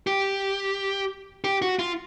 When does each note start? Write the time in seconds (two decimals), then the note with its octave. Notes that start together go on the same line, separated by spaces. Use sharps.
0.07 G4
1.44 G4
1.62 F#4
1.79 F4